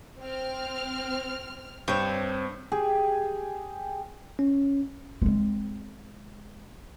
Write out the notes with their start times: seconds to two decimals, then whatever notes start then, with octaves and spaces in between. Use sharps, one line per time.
0.21 C4 F6
1.88 G2 C4 D4 C#5
2.72 G4 G#4
4.39 C#4
5.22 G#3 C4